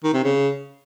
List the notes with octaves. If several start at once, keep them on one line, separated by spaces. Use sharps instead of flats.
D#3
C3
C#3